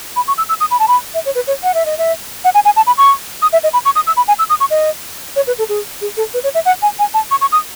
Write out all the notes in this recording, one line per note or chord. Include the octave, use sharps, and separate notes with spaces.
B5
C#6
E6
E6
D#6
B5
A5
B5
E5
C#5
B4
C#5
F#5
E5
D#5
E5
F#5
G#5
G#5
A5
B5
C#6
D#6
E5
D#5
B5
C#6
D#6
E6
B5
G#5
E6
D#6
C#6
D#5
C#5
B4
A4
G#4
G#4
A4
B4
C#5
E5
F#5
G#5
G#5
A5
C#6
C#6
D#6